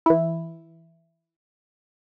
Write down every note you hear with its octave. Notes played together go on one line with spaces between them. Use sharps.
E3 E4